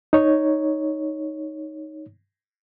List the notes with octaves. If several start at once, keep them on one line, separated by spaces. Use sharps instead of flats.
D#4 C#5